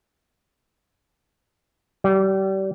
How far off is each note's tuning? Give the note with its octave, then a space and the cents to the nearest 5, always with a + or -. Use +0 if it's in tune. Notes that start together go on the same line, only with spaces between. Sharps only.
G3 -30